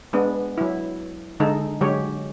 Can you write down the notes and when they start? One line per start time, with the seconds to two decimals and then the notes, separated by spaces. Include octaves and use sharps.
0.13 G#3 B3 D4
0.57 F#3 E4
1.40 D3 G#3 D#4 A4
1.81 D3 F#3 G#3 G4 C#5